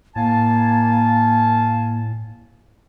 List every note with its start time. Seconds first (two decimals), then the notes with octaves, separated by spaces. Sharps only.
0.16 A2 A#3 F5 G#5 A5